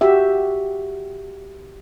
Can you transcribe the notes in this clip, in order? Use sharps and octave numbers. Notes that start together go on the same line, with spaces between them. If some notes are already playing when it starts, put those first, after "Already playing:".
F#4 G4 E5